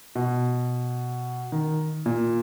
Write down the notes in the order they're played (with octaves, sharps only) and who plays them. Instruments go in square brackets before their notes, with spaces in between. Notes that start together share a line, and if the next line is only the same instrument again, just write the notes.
[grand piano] B2
D#3
A#2